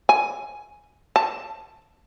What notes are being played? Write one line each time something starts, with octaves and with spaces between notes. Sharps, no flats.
G#5
A5